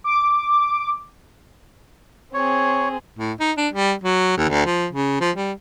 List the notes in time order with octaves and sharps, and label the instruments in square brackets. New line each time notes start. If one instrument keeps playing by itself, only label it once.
[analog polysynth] D6
[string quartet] C4 G#4 [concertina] C#5
[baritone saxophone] A2
D#4
D4
G3
F#3
D#2
D2
F3
C#3
F3
G3